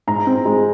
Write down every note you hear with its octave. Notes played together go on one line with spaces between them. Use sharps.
G#2 A#5
C4
G#3